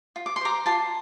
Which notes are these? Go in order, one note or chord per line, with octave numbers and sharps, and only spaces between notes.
F4
D6
C6
C5 A#5 D6
F4 A5 C6